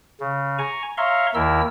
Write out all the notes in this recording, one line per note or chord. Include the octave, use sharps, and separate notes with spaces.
C#3
G#5 A#5 C#6
C#5 E5 F5 A#5 C6 C#6
D#2 D#3 E4 A#4 E6